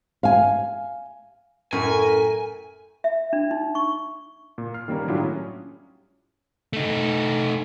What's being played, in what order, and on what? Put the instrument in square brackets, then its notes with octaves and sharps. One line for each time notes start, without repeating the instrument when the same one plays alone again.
[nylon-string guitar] F5 G#5
[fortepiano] F#2 [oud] A2 [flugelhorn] A#4 [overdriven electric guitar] G#5
[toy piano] E5
D4
D#4
C#6
[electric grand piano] A#2
F6 C7
D#3 G3 A#3 C#4 A#4
A2 F#3 D4 E4 F4 G4
C#4 D#6
[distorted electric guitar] A3 D#4